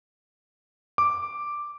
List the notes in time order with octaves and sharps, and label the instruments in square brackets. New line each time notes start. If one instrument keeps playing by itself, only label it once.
[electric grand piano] D6